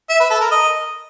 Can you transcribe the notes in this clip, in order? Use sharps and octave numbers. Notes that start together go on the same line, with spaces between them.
E5
B4
A4
A#4
D#5